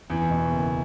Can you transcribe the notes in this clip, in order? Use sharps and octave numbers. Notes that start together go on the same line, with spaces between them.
E2
B2
F#1